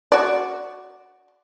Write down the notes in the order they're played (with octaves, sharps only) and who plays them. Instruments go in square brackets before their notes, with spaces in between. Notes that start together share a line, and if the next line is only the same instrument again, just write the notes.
[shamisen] F#4 D5